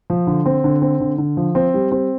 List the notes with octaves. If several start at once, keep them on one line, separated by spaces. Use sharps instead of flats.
F3
D3
C4
D3
C4
D3
D3
F3
C4
G3
C4